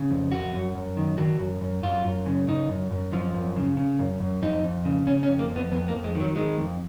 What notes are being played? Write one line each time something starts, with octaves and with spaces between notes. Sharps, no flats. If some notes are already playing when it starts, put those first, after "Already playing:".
Already playing: C#3
F2
F2 F#4
F#2
F#2
D#3
D#3 F#4
F#2
F#2
F#2 F4
F#2
C#3
C#3 D#4
F#2
F#2
F#2 F3
F#2
C#3
C#3
F#2
F#2
F2 D#4
F2
C#3
C#3 C#4
C#4
F2
A#3
F2
B3
F2 B3
A#3
F2
G#3
D#3
F#3
D#3 G#3
F2